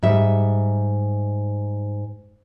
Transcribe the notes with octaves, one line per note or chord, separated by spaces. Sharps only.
G#2 G3 E5